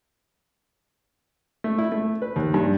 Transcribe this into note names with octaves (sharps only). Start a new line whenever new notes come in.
A3
E4
A3
B4
D#2
G2